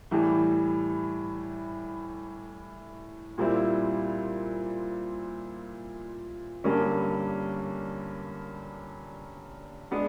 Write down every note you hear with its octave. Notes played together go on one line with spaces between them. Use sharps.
A2 E3 G3
A#2 G3 C4 E4
G2 D3 G3 A#3 C#4
G#3 B3 D4